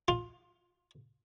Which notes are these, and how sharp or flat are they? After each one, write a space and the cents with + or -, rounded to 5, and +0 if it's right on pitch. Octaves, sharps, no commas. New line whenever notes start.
F4 +15